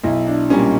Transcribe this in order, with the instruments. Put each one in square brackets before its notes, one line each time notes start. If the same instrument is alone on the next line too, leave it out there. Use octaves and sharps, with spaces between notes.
[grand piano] B1 E4
D4
A#2 G3 A#3 C#4